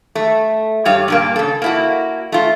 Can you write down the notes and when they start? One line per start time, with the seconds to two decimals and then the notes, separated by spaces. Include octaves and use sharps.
0.15 A3
0.85 G2 G3 C#5 F5
1.08 G2 A#2 A#3
1.36 C#3 A4
1.62 A#3 E4 F#4
2.32 A3 F4